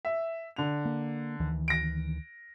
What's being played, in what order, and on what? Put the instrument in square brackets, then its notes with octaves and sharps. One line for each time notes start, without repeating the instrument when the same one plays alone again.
[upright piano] E5
D3 F7
[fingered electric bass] A#3
D2 D#3 E3
[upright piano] A#6 D7